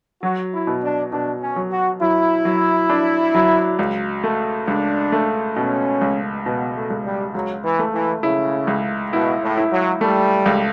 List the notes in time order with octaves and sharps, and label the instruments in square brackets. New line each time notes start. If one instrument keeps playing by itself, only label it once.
[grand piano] F#3 [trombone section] F#4
[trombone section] E4
[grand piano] B2
[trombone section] D4
[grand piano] B2 [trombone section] D4
[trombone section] C#4
[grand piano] F#3
[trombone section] F#4
[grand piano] F#3 [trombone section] E4
[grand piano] F#3
D4
F#3
C#2
A3
[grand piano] C#2 [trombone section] D4
[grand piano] A3
[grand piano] B2 [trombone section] C#4
[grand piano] C#2
[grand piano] B2 [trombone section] B3
[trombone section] A3
[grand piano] C#2
[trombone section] G3
[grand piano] C#2 [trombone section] F#3
[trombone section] E3
[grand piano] A3
[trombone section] E3
[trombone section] C#3 [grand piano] E4
[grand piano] C#2
[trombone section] B2 [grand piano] E4
[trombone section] A2
[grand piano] E4
[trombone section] F#3
[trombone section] G3 [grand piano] A3
[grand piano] C#2